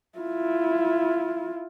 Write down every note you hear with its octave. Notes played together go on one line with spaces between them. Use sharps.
E4 F4